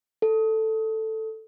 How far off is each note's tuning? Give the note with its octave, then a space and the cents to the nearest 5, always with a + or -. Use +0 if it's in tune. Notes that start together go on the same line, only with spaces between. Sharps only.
A4 +5